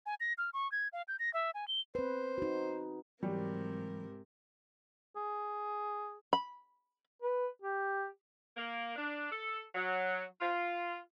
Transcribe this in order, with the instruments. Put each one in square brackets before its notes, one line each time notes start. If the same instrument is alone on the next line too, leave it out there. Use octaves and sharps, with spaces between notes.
[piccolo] G#5
A#6
F6
C#6
G#6
F5
G6
A#6
E5
G#5
G7
[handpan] C4 B4 [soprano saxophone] C5
[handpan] D#4 F#4
[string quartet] G#2 C3 A#4 [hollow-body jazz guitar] E3 F#3 [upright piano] G3
[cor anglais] G#4
[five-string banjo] B5
[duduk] B4
G4
[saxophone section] A#3
D4
A4
F#3
F4